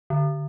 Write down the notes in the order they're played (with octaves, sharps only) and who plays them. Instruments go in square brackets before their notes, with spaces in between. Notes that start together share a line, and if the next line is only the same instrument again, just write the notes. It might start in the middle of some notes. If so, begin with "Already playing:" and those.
[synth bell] D3